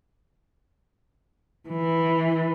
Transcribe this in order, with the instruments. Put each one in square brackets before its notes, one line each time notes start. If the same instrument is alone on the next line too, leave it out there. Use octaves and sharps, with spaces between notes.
[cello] E3